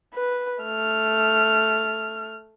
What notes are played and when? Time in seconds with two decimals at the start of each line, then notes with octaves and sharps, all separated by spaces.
0.15 B4
0.63 A3 F6